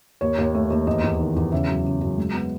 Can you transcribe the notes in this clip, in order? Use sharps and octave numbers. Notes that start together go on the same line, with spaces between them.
D#2 C#5
D#2
A3
D#2
E2 D#5
E2
D#3
E2
C#3 E5
F#2
C#3
F#2
G#3
B3